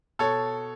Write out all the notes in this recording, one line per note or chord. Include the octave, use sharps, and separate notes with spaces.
B2 A4 C#5